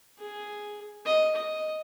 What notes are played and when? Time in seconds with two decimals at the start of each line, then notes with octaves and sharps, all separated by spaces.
0.19 G#4
1.06 D#5
1.36 D#5